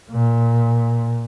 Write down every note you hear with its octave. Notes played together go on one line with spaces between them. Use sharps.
A#2